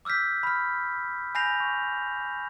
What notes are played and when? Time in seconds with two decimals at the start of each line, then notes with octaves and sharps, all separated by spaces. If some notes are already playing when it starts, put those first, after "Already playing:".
0.05 D6 E6 F6 G6 B6
0.43 B5 F6
1.35 G#5 B5 G6 A#6 C7 F7
1.60 C#6